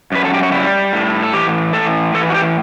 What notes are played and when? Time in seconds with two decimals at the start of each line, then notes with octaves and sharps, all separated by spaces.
0.12 F#2 B4
0.25 A4
0.34 G4
0.43 F#4
0.52 G3 E4
0.93 A2
1.23 A4
1.33 E3 G4
1.73 A2 A4
2.14 E3 A4
2.30 F#4
2.34 G4